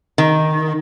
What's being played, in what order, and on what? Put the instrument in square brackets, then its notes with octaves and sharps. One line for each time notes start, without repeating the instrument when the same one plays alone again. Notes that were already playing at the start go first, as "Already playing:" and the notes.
[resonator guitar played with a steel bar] D#3